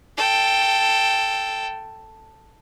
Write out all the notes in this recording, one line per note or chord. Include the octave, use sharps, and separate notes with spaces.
A4 G5